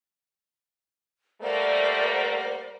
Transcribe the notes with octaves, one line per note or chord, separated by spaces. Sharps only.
G3 A3 A#3 A#4 C5 D5 F#5